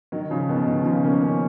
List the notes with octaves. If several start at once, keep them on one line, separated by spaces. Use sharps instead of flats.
D#3 F#3
C#3 F3
B2 D#3
B2 D#3
C#3 F3
A#3 C#4
A#3 C#4